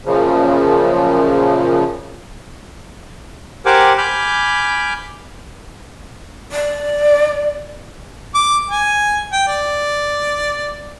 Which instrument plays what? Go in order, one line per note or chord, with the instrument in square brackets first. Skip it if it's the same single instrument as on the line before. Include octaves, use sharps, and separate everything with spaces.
[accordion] F#2 A#2 C#3 F3
[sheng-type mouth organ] G4 A#4 C5 F#5 G#5 D6
G#5 B5 D6 F6 G6
[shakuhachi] D5
[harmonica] D6
G#5
G5
D5